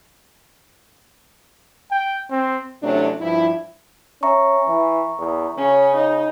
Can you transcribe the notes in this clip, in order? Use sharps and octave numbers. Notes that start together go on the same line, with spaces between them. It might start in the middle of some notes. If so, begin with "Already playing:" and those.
G5
C4
C3 E3 F#3 A3 C#4 D4
G2 F3 E4
C#4 E5 A#5 C#6
E3
E2
C#3 C#4
D#4